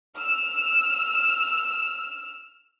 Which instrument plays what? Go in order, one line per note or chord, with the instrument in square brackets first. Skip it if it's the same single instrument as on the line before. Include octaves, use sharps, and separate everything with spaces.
[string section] E6 F6